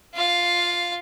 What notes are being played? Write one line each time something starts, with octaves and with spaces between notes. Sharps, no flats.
F4 F5